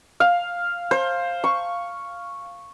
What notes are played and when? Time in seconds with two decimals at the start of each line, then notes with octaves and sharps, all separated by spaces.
0.20 F5
0.91 C5
1.44 C#6